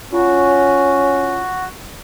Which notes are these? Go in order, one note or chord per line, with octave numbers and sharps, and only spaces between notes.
C#4 F4 F#4